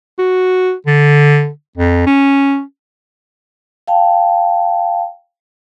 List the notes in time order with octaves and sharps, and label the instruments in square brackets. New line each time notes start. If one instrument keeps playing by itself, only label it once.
[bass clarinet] F#4
D3
F2
C#4
[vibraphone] F5 G5 A5